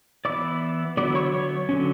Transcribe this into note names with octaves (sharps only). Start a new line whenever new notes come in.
E3 B3 E4 D5 D6
D3 F#3 B3 E4 D5 D6
C#5 C#6
C#5 C#6
D3 F#3 C#4